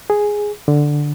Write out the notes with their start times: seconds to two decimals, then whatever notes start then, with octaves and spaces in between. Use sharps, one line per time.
0.10 G#4
0.68 D3